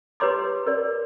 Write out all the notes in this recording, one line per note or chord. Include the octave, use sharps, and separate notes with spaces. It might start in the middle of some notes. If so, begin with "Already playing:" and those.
G4 B4 C#5 C6 D6
A#4 D5